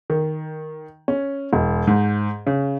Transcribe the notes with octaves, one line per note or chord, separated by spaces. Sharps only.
D#3
C#4
E1
G#2
C#3